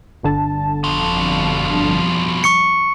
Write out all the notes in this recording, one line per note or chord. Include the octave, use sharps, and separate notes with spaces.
G1 D3 A5
F2 B2 G3 F4
C#6 C#7